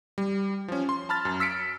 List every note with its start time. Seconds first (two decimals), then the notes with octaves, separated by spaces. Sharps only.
0.18 G3
0.68 F3 C#4
0.89 C6
1.09 A5 B5 F6 A6
1.25 F#2
1.40 E6 B6 C#7 D7